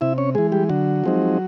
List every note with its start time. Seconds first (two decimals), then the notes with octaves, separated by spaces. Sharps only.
0.01 C3 E4 E5
0.18 C#4 C#5
0.35 E3 G#3 G#4
0.52 G3 G4
0.69 D3 F#3 F#4
1.04 F3 G#3 C4 D#4